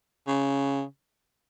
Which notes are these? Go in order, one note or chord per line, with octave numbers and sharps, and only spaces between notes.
C#3